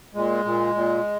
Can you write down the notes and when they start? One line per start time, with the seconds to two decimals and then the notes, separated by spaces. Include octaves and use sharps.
0.15 A#2 G#3
0.45 A#2
0.75 A#2